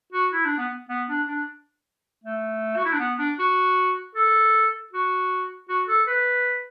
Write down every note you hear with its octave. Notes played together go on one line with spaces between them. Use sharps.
F#4
E4
D4
B3
B3
D4
D4
A3
F#4
E4
D4
B3
D4
F#4
A4
F#4
F#4
A4
B4